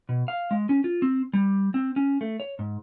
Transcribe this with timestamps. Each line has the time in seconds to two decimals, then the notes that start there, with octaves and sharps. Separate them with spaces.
0.09 B2
0.28 F5
0.51 G#3
0.69 C#4
0.84 F4
1.02 C4
1.33 G3
1.74 C4
1.96 C#4
2.21 A3
2.40 C#5
2.59 G#2